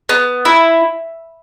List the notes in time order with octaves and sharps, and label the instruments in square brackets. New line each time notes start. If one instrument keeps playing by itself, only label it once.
[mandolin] B3
E4